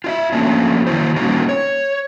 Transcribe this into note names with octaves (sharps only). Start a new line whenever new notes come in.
F4 D#5 E5
F3 F#3 A3 A#3 C#4 D4
D#3 F#3 A#3 E4 C5
G3 A#3 C#4 D#4 F#4 G4
C#5